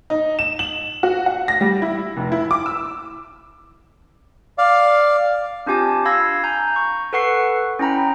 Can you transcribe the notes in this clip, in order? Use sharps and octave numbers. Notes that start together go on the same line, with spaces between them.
D#4
E7
F#7
F#4
F#5
A#6
G3
E4
F1
E4
D6
E6
D5 F5
C4 D4 F4 G4 G#5 A5
F5 B5 E6 G#6 A#6
G#5 A#5 G6
C#6
A4 B4 F#5 C#6 C7
C#4 E4 G5 A#5 B5